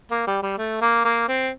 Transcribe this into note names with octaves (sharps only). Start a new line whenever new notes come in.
A#3
G3
G3
A3
A#3
A#3
C4